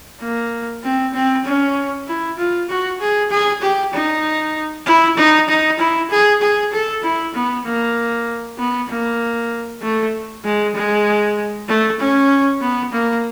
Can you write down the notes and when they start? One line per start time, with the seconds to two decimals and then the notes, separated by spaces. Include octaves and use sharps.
0.21 A#3
0.84 C4
1.14 C4
1.45 C#4
2.07 E4
2.38 F4
2.69 F#4
3.01 G#4
3.31 G#4
3.62 G4
3.94 D#4
4.86 E4
5.18 D#4
5.49 D#4
5.79 E4
6.11 G#4
6.42 G#4
6.72 A4
7.03 E4
7.35 B3
7.65 A#3
8.58 B3
8.90 A#3
9.82 A3
10.44 G#3
10.75 G#3
11.68 A3
12.00 C#4
12.61 B3
12.93 A#3